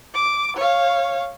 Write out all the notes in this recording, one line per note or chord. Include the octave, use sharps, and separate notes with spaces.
D6
C#5 F5